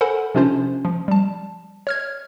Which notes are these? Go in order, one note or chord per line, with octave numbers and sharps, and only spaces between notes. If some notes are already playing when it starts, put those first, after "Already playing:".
A4 A#4 C5 F#5 G#5 B5
C3 F3 C#4 D4 F4 C5
F3
G3 A5
C#5 F6 G#6